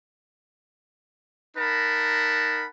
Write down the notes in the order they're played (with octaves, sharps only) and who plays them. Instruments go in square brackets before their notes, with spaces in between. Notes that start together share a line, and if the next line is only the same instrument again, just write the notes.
[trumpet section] D#4 A#4 F#5 A5 B5